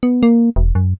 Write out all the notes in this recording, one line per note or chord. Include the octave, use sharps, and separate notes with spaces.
B3
A#3
E1
F#2